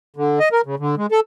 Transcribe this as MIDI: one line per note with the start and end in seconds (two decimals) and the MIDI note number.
0.17 0.39 50
0.40 0.49 75
0.52 0.61 70
0.66 0.75 49
0.79 0.95 50
0.97 1.06 56
1.12 1.20 69